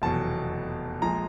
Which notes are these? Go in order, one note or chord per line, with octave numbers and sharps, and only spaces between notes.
F1 E2 B2 F#3 A5
A#1 A#2 F3 G#3 A#5